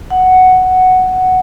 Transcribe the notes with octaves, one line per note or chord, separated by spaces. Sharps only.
F#5